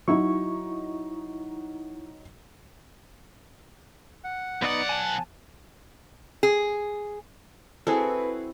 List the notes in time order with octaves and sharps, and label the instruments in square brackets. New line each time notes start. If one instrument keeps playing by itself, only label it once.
[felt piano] F#3 D#4 [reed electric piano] E4 C#6
[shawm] F#5
[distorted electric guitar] B1 F#5 [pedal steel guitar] B3 D#4 D#6 [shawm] D5
[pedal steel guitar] G#5 A5
[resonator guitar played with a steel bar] G#4
[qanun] C4 E4 F#4 [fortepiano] G#4 A4 [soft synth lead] B4